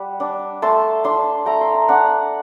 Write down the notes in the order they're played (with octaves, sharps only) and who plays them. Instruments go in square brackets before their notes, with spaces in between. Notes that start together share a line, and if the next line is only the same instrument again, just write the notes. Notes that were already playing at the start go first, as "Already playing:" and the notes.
Already playing: [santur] G3 F#5
D4
A3 A5 C6
D4 A5 C6
A3 G5 A#5
C6
A#5
D4 F#5 A5